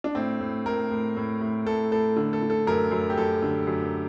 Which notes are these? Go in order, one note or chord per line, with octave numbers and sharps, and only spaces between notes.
D4
A2 C4
A2
A2 A#4
A2
A2
A2
A2 A4
A2 A4
D3
A4
D3
A4
F#2 A#4
F#2
G4
F#2 A4
D3
F#2